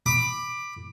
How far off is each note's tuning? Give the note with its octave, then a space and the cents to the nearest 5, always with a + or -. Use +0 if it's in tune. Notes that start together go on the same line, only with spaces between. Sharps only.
B5 +0 D6 +15